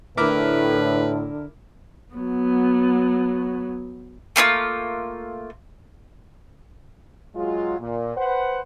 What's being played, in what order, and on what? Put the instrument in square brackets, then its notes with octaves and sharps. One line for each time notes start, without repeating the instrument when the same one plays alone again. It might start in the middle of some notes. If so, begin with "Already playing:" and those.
[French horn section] A2 [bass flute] D3 [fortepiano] E4 A#4 D6 [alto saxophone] B4
[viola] F#3 B3
[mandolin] A3 A#3 D4 F4
[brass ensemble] F#3 G#3 F4
A#2
B4 C5 F#5